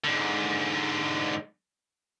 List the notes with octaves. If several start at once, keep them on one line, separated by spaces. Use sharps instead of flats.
G#2 D3